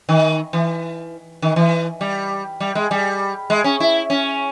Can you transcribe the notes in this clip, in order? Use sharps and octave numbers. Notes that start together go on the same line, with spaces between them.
D#3
E3
D#3
E3
G3
G3
G#3
G3
G#3
C#4
E4
C#4